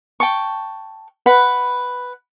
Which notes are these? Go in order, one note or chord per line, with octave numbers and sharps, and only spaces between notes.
G5 A5 C#6
B4 F#5 B5